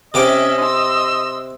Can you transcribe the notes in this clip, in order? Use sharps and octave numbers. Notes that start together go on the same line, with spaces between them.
C3 C#4 G4 D#5 E5 D6
C6 E6